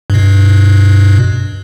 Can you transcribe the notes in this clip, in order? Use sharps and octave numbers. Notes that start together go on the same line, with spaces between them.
G2 B2